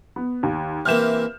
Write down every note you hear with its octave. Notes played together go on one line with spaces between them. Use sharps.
B3
D#2
C3 E3 A#3 F6 G6 E7